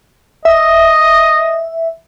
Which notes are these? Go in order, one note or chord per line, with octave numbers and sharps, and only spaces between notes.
D#5 E5